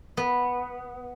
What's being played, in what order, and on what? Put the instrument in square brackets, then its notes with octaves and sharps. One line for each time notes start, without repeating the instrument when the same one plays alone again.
[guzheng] B3